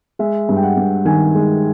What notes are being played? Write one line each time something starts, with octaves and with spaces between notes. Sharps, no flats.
G#3 E5
G2
G5
F#5
G2
D#3 G#5
G#3